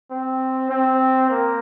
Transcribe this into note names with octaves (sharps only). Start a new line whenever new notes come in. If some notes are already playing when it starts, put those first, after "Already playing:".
C4
C4
A#3